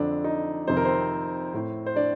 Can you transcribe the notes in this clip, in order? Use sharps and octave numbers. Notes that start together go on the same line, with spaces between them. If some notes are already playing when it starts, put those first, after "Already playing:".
Already playing: F2 D3 D4
D#4
F2 C3 D#3 C5
A#4
C4 C5
A2
C5
D4 D5